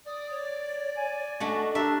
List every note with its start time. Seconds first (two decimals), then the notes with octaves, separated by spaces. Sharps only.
0.07 D5 D#6
0.30 C#5
0.97 G#5
1.40 A3 D4 F#4 D#5
1.75 D4 G4 A#4 E5